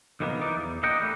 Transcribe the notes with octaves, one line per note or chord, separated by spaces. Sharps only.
B1 F2 D#3 A#3 B3
E3 D#4 D5
E2
A#3 D4 D#5 F#5 G5
G3 A3